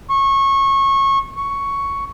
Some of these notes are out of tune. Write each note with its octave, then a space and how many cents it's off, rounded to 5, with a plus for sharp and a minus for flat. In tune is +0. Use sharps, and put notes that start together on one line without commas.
C#6 -20
C#6 +5